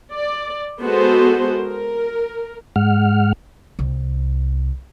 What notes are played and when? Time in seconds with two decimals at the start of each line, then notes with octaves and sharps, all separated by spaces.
0.13 D5
0.80 G#3 B3 F#4 A4 C5
1.58 A#4
2.76 G#2 G#3 F#5 F6
3.79 C2